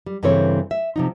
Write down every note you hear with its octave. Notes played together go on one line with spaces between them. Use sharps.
G3
G2 C#3 E3 C4 A4 C#5
E5
C3 F3 D#4